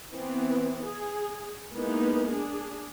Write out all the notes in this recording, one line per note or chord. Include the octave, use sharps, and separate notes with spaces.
E3 B3 C4
G#4
G#3 A#3 B3 D#4 E4 B4
D4 G#4